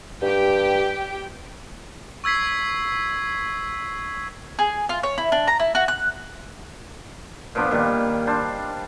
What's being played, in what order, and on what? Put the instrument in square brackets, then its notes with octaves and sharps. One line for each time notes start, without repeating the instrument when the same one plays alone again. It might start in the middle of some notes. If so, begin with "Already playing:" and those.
[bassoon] G2 [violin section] G4 G5
[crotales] C#6 E6 G#6 B6 C7
[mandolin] G#4
F4
C#5
E4
D4
A#5
E4
F#4
F#6
[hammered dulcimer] A#2 F3 B3 D4
A#2 D#3 G3
D4 C5 A5